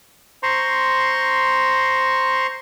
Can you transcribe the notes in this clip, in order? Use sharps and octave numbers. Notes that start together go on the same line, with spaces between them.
C5 A#5 C6 C#6